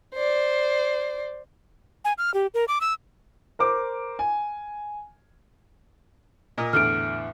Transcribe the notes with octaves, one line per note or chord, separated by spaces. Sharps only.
C5 D5
G#5
F6
G4
A#4
D6
E6
A#4 C5 D6
G#5
A#2 A#4 D#5
E2 A2 D3 F6 D7